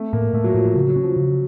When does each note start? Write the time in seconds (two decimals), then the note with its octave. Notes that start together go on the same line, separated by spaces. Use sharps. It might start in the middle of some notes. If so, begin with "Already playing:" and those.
Already playing: A3 C4
0.13 A2 A#3
0.33 A2 A3
0.44 F#3
0.54 A2 F3
0.65 F3
0.75 C#3 F#3
0.89 F#3
0.96 C#4
1.03 F3
1.16 C#3